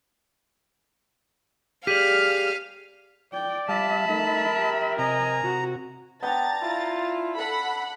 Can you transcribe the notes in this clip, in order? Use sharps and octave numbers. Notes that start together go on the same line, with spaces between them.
G4 G#4 D5 F5 F6 B6 D#7
D5 G5
G3 E5 F5 A5 B5
A3 D#4 A#4
G4
C3 D#5 G#5 A#5
C3 F#4
B3 D4 G5 A#5 A6
E4 F4
A4 F#5 B5